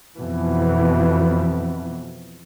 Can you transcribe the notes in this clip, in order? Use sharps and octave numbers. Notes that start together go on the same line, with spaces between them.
F2 B2 E3